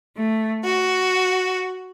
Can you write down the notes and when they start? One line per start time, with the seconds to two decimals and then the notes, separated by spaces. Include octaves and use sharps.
0.17 A3
0.64 F#4